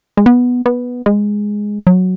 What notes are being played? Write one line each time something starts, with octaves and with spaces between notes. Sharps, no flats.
G#3
B3
B3
G#3
F#3